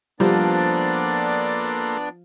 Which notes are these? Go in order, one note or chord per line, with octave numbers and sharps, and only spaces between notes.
F3 G3 A#3 B3 D4 A4 D5 C6